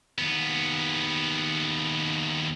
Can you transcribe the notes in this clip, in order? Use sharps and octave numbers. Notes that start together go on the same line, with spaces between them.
D#2 B3